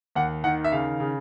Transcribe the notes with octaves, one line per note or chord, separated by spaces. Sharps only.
D#2 F#5
D#3 F#5
E5
C#3 F5
C#3